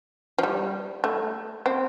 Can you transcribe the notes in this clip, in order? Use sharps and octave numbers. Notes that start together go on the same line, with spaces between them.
F3
G3
A3
C4